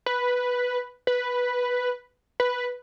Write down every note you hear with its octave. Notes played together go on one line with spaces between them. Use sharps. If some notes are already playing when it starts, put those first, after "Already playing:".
B4
B4
B4